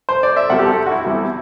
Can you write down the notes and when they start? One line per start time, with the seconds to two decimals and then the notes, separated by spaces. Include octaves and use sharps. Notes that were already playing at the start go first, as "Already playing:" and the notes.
0.09 C5
0.23 D5
0.36 E5
0.50 C2 C3 G3 F#5
0.59 G4
0.64 A4
0.86 F#4
0.91 E4
1.05 E2 C3 G3